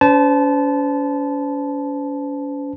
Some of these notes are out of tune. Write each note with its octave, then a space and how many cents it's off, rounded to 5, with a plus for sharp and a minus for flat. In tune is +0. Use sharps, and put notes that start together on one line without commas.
C#4 +40 C5 -40 A5 -20